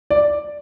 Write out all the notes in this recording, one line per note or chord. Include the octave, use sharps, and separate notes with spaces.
D5